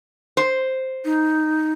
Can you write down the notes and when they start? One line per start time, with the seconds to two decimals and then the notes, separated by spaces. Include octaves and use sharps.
0.37 C5
1.05 D#4